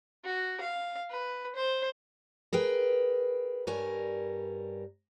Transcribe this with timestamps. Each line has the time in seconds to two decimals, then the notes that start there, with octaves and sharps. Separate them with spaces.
0.25 F#4
0.61 F5
1.10 B4
1.55 C5
2.53 G#4 A#4 B4 G5
3.67 G2 G3 A#4 C#5 G#5